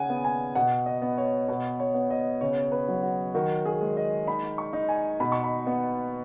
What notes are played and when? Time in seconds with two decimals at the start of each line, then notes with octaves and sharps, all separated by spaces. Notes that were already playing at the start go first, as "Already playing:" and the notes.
Already playing: C#3 F#5 G#5
0.10 B3
0.25 G#5
0.55 B2 F#5
0.86 D#5
1.02 B3
1.18 C#5
1.48 B2 B4
1.80 C#5
1.94 B3
2.10 D#5
2.41 C#3 C#5
2.72 B4
2.88 F#3
3.03 F#4
3.35 D#3 F#4
3.65 G#4
3.81 G#3
3.97 D#5
4.27 D#4 B5
4.58 C#6
4.73 D#4
4.89 G#5
5.20 B2 B5
5.32 C#6
5.44 B5
5.67 B3